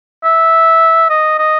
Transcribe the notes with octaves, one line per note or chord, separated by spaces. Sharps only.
E5
D#5
D#5